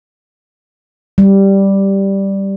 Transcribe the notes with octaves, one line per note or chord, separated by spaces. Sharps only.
G3